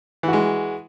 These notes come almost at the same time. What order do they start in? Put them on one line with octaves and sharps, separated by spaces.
E3 F#4 G#3